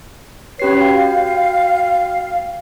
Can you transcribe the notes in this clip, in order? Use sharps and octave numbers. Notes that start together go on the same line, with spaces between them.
C#4 G4 B4 C#5 C7
F#4 F5 G5